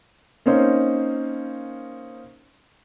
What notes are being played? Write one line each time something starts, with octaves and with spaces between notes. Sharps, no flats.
A#3 C4 C#4 D#4 C5